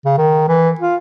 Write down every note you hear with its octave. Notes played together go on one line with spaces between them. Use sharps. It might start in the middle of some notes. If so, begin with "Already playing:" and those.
C#3
D#3
E3
F4